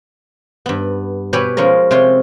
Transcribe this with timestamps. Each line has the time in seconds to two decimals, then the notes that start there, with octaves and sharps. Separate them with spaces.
0.66 G2 B3
1.33 B2 G4 B4 C#5 G#5 B5
1.57 F3 G#3 C#4 A#4
1.91 C3 F4 C#5 C6